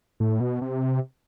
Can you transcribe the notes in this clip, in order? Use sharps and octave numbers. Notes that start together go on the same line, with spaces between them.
A2
B2
C3